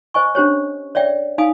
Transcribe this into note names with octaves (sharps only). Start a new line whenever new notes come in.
C5 D#5 G#5 C#6
C#4 D4 G4 C5 C#5
C#5 D5 E5 G5
D#4 F5 G#5 D#6